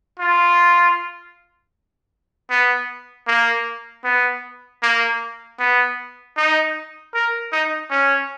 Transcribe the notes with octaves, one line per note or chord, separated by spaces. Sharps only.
F4
B3
A#3
B3
A#3
B3
D#4
A#4
D#4
C#4